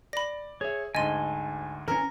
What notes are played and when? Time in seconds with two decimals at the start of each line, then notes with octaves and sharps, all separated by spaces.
0.13 D5 B5 A#6
0.61 G#4 C#5 E5
0.95 D2 G#2 D#5 G#5 A5 C6 D#7
1.88 E3 C#4 A#4